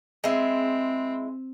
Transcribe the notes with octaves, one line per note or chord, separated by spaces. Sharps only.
G#3 C4 E4